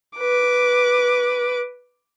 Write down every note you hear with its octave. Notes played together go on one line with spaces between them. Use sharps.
B4 D6